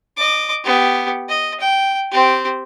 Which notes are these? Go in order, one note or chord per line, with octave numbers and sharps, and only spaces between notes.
D#5 D6
B3 G4
D#5
G5
C4 G4